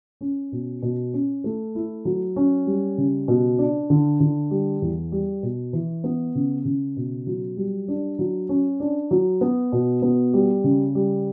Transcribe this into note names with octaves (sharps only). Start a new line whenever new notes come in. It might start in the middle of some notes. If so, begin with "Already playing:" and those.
C#4
B2
B2
C#4
A3
E4
F#3
C#4
G3
C#3
B2
D4
D3
D3
G3
E2
G3
B2
E3
B3
C#3
C#3
B2
F#3
G3
D4
F#3
C#4
D4
F#3
B3
B2
B3
G3
C#3
G3